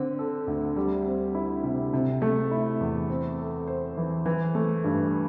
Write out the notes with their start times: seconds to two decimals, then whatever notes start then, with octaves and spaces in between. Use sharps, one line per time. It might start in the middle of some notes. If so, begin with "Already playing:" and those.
Already playing: D3 C4
0.19 A4
0.47 D2
0.76 G3
1.06 C4
1.35 E4
1.64 C3
1.93 C3
2.22 A3
2.51 E4
2.81 E2
3.10 C4
3.39 A4
3.67 C5
3.97 E3
4.26 E3
4.55 A3
4.84 G2